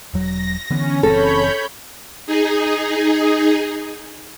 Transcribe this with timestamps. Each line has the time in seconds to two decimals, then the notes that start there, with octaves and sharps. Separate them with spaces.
0.14 E1 F#3 A#6
0.70 D3 E3 B3 C#4
1.03 F#1 E3 C4 A4 C#5 B5 G6
2.27 D#4 G#4